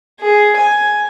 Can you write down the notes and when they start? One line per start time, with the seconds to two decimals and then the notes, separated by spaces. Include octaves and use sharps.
0.20 G#4
0.57 G#5